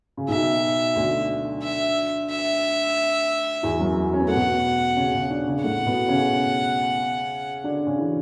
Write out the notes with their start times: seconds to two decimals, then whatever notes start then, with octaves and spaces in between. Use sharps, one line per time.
0.17 C#3
0.28 B1 B2 E5
0.96 D2 D3
1.63 E5
2.30 E5
3.63 E2 E3
3.79 F#2 F#3
4.13 C#4
4.20 B3
4.28 A3 F#5
4.35 B2 B3
4.96 C#3 C#4
5.14 C#3 C#4
5.30 D3 D4
5.47 C#3 C#4
5.63 A2 A3 F#5
5.85 B2 B3
6.08 C#3 C#4
7.64 D3 D4
7.87 C#3 C#4
7.99 E3